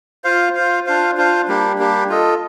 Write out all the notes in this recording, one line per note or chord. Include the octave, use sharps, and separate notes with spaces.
F4 C5 F5
F4 C5 F5
D4 F4 C5 F5
D4 F4 C5 F5
G3 A#3 D4 G4
G3 A#3 D4 G4
F4 A4 D#5